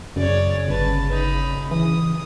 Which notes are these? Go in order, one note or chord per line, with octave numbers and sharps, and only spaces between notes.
F#2 C#3 C#5 D5
G1 B4 A5
D#4 B5
E3 D#6